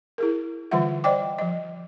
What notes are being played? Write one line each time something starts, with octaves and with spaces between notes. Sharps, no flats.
E4 G#4 A#4
D3 E3 G3 F4 E5 F#5
C5 D5 D#5 G5 D6
F3 D#5